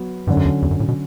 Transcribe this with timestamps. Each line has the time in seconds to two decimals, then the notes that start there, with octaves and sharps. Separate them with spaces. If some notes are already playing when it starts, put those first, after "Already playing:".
Already playing: F#3 B3 F#4
0.27 G2 D3 F#3 C#4
0.37 F#2
0.45 E2
0.62 E2
0.71 F#2
0.80 A2
0.88 B2